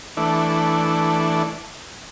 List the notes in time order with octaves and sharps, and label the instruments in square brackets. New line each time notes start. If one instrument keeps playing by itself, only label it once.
[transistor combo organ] E3 A3 D4